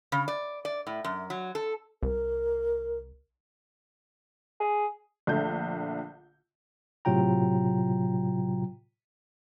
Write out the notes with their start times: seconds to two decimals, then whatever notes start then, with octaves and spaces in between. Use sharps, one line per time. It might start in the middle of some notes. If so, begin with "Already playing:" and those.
0.12 C#3
0.28 D5
0.65 D5
0.87 A2
1.04 F#2
1.30 F#3
1.55 A4
2.03 C2 A#4
4.60 G#4
5.27 A#1 D3 A3 G6
7.05 A2 C3 F#3 F4 G5 A#5